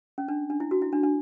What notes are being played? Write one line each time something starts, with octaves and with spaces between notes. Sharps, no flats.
C#4
D4
D4
E4
F#4
E4
D4
D4